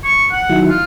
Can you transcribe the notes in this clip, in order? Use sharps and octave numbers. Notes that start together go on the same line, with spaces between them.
C#6
F#5
D#3 F#3 E4
F4